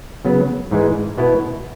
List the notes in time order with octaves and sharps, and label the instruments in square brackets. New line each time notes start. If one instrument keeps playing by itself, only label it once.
[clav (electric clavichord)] C#3 F#3 B3
G#2 E3 G#3
B2 B3 E4